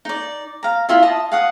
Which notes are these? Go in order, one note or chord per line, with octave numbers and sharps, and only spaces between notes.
D#4 D5
F5 A#5
E4 F4 E5
D#5 A5 D#6
F5 F#5 D#6